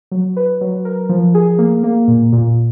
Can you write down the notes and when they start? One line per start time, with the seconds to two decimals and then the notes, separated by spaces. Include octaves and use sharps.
0.12 F#3
0.37 B4
0.61 F#3
0.85 A#4
1.09 F3
1.35 G#4
1.59 A#3
1.84 A#3
2.08 A#2
2.33 A#2